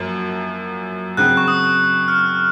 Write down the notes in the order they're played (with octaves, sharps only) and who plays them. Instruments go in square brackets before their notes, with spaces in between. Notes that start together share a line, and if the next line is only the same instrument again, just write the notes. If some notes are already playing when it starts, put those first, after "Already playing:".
Already playing: [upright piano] F#2 F3 A#3
[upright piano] C#3 F#3 C4 [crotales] F#6
[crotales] C#6
D#6
F6